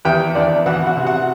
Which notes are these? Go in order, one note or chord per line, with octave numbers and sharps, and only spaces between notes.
E2 G4 G5
E2 D4 D5
E3 F#4 F#5
F#4 F#5
C3
F#4 F#5